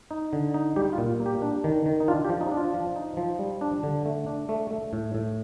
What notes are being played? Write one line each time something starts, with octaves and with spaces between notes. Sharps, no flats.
D#4
D3
D#4
G3 G4
F4
A#2
A#3
G4
D4
D#3
D#3
D#4
D4 F4
G4
F3
D#4
D4
F4
F3
D#4
F3
G3
D4
D3
A3
D4
A3
A3
A2
A2